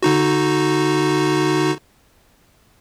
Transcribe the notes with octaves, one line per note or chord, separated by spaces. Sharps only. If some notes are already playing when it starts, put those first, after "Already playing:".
D3 D#4 F#4